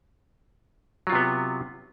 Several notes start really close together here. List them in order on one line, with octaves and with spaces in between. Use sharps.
F#3 F4 C3 B3